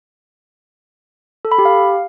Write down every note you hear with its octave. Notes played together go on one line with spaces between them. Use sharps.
A4
B5
G4
F5